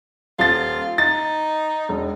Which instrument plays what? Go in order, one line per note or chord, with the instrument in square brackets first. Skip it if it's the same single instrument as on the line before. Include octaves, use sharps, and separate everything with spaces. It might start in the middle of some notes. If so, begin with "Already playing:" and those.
[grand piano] D#1 A6 [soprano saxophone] F4
[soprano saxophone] D#4 [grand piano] A6
[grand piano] E1